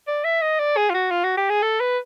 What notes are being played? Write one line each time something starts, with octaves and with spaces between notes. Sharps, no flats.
D5
E5
D#5
D5
G#4
F4
F#4
F4
F#4
G4
G#4
A4
B4